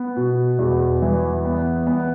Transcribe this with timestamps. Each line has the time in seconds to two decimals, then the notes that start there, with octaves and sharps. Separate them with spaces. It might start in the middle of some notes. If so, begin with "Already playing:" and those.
Already playing: B3
0.16 B2
0.59 E2
1.02 E3
1.45 B3
1.87 B3